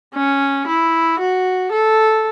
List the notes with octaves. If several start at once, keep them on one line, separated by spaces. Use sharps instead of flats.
C#4
E4
F#4
A4